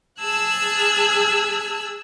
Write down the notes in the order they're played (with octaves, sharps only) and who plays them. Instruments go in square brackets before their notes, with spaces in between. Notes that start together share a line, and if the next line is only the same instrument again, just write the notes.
[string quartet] G#4 A5 E6 F#6 G#6